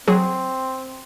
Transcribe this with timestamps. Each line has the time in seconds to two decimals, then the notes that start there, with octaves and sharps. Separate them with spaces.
0.08 F#3 C4 G#4